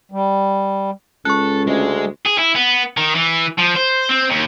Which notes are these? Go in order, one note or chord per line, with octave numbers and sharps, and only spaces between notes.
G3
C#2 A4 C#6 F#6
D2 G#3
G#4
E4
B3
D#3
E3
F3
C5
C4
D#2